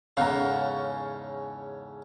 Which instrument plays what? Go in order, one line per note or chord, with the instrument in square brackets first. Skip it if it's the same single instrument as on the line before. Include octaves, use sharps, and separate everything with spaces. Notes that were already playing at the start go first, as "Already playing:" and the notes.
[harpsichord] E2 G#2 C#3 [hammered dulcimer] C#4 A4 F#5 [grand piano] F5 A#5